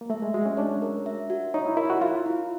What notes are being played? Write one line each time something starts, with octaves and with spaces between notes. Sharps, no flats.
A#3
A3 E5
G#3
G#3 F#4
C#4
D4 C#5
A#4
E5
F#4
D#4 C#5
E4
E4 A#4
F#4
F4 F5
E4